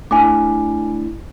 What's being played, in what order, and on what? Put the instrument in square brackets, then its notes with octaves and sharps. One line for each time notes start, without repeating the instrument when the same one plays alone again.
[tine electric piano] A3 D4 E4 [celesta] G#5 D6